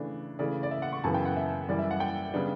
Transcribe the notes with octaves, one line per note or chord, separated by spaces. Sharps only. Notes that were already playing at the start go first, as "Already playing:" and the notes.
Already playing: C#3 E3 A3 D4
C#3 E3 A3 D5
D5
E5
F#5
C#6
F#2 C#3 E3 B3 A5
G5
F#5
E5
F#2 E3 G3 D5
E5
F#5
G5
C#3 G3 B3 D4